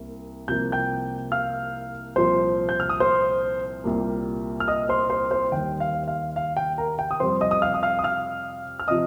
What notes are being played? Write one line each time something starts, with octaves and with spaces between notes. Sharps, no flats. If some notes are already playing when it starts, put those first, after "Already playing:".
Already playing: C2 A#3
C2 C3 F3 A#3 G6
G5 G6
F5 F6
C2 A#2 F3 C5 C6
G6
F6
D#6
C5 C6
C2 A#2 G3 A#3
F6
D#5 D#6
C5 C6
C5 C6
C5 C6
D#2 D#3 G3 G5
F5
F5
F5
G5
A#4 A#5
G5
D#6
F2 C3 G3 C5 C6
D#5 D#6
D#6
F5 F6
D#6
F5 F6
D#6
F5 F6
F6
C3 F3 D#5 D#6